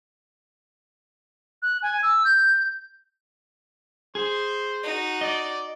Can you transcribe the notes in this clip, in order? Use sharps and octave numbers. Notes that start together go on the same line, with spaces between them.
F#6
G#5
E6
G6
G#4 C5
D#4 F#4
D5 D#5